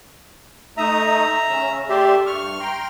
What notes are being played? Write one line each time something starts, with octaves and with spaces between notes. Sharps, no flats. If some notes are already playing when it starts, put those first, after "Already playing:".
A3 D#4 E5 A#5 D#6
C#3 C#4
A3 G4 D5 E5 C6
G2 C#6 F6
G5 A#5 C6